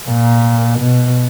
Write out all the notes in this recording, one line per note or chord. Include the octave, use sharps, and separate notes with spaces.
A#2
B2